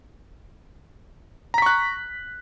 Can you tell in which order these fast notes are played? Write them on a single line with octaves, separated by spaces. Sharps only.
A#5 B6 C#6 F#6